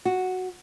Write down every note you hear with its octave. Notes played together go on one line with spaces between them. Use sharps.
F#4